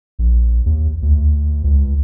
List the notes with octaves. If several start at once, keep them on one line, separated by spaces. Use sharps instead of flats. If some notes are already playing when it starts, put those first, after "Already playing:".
A#1
D#2
D2
C#2